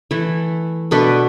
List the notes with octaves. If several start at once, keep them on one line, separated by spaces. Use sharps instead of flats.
E3 A3 E4
B2 A3 D4 B4